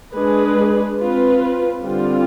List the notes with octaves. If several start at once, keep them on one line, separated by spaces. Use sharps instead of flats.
G#3 D4 G#4 B4
C4 F4 B4
D3 G3 C4 F4